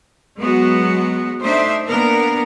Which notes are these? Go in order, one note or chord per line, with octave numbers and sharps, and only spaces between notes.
F#3 G#3 B3 F#4
A3 D4 D#4 C5 E5
A#3 B3 D4 A#4